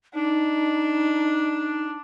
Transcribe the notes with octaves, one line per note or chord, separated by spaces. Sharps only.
D4 D#4